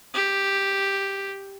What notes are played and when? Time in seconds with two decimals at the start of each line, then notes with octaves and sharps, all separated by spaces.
0.14 G4